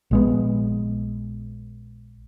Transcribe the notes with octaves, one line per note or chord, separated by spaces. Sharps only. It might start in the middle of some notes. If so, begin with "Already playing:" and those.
A#1 G#3 B3